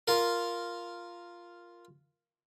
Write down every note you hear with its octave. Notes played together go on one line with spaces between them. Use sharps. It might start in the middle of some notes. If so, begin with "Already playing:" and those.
F4 A#4